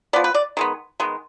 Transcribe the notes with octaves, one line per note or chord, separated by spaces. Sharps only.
F3 B3 D5
B4
D5
D#3 G#3 B3
D#3 G#3 B3